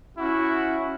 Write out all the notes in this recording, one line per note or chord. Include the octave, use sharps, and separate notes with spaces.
C#4 E4 F#4